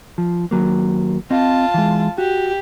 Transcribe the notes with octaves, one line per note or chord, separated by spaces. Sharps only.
F3
D#2 F#3 A#3
C4 F4 D#5 A5
E3 G#3
F#4 G4